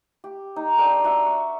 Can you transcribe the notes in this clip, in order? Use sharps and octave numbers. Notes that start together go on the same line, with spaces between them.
G4
D#4
D4 A#4 D5 G5
F#4 E5
C#6